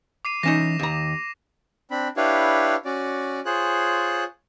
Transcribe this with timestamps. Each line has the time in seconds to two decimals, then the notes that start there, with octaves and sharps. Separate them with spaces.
0.25 D6 C7 D#7
0.43 E3 C#4 D#4 A#6 E7
0.79 D#2 A#5
1.91 C4 D4 B5
2.17 D4 E4 G4 B4 C#5 F5
2.85 C#4 F#4 D5
3.46 F4 G#4 C5 C#5 F#6